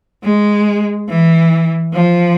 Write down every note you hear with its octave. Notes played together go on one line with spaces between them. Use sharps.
G#3
E3
F3